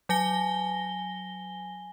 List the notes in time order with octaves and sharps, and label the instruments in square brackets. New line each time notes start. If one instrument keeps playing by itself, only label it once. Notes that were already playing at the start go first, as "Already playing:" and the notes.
[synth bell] F#3 G#5 A#6 G7